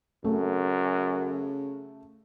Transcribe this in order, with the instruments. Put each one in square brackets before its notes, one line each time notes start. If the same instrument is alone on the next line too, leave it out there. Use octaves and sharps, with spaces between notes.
[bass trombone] F#2 [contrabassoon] C#3 [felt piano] A3